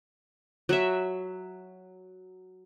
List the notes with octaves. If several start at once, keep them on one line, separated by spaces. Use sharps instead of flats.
F#3 E5